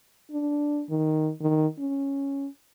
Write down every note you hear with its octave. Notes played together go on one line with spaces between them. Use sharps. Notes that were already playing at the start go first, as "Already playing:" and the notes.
D4
D#3
D#3
C#4